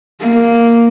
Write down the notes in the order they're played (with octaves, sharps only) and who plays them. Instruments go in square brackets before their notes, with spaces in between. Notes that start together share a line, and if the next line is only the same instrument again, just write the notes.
[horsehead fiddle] A#3